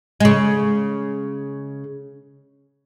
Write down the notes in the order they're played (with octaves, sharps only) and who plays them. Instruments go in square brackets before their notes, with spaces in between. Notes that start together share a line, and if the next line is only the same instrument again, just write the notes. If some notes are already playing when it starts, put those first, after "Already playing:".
[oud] C#3 G#3